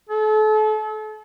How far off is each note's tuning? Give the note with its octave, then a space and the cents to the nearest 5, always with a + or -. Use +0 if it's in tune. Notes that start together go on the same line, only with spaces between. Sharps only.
A4 -35